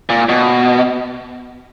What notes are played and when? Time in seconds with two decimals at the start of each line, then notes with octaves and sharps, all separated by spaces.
0.10 A#2
0.29 B2